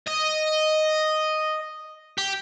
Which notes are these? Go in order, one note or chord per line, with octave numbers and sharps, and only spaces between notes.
D#5
G4